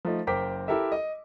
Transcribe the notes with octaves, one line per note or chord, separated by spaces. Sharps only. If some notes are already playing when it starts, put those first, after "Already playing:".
F3 A3 D#4
F#1 A#4 C5 G5 D6 B6
E4 G4 A4 A#4 E5
D#5